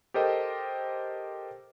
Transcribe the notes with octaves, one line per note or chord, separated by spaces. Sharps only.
G4 A4 A#4 C5 D#5 G5